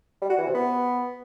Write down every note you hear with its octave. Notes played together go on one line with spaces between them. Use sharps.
G3
F#4
E3
C3
B3